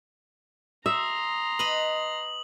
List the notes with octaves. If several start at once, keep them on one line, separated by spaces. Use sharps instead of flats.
E5 A#5 C6 D#6
B4 D#5 F#7